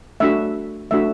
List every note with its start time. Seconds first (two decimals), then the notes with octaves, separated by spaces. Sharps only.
0.20 A3 D4 F#4 E5
0.91 A3 D4 F#4 E5